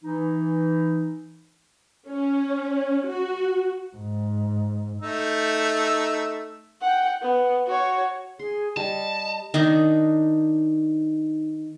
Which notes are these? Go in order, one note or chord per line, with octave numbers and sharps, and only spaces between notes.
E3 D#4
C#4
F#4
G#2
A3 D#4 E6
F#5 G5
B3
F#4 C#5
G#4 C6
G3 D#5 A5
D#3 D4 D#4